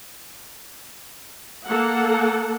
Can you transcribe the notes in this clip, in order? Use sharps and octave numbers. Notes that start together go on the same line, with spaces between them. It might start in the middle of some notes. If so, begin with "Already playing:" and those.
A#3 A4 F#5